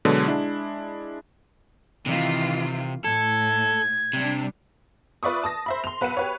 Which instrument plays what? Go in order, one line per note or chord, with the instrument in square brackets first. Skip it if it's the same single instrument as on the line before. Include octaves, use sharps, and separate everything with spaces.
[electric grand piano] B2 D3 F#3 G#3
G#3 D4 E4
[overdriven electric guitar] C3 [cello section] D#3 E3 F4
[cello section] A2 [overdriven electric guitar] A4 [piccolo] G#6
[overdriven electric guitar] C3 [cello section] G3 D4
[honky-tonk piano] F4 B4 D5 E5 C#6 D#6
A5 D#6 A#6
C5 E5 B5
C6 F7
B1 B4 F#5 D#7
G4 B4 C#5